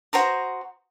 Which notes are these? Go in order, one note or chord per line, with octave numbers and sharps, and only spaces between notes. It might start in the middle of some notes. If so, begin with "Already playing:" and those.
F#4 C5 A#5 D#6